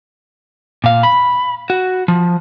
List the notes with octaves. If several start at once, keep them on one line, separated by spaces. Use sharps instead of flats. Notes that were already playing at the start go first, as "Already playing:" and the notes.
A#2 F5
B5
F#4
F3